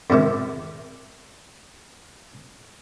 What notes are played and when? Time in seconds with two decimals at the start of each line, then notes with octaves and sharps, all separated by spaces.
0.10 F2 G#2 C3 D#3